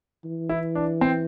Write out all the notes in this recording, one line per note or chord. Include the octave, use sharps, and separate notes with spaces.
E3
E4
D4
C4